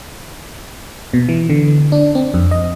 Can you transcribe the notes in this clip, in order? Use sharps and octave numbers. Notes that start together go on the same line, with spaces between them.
B2
E3
D3
D4
C4
F2
D#5